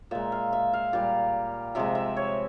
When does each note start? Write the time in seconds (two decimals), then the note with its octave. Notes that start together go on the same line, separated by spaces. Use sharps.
0.11 A#2 G#3 E5
0.32 F5
0.53 E5
0.73 F5
0.93 A#2 G3
1.75 C3 F3 G#3 E5
1.95 E5
2.17 C#5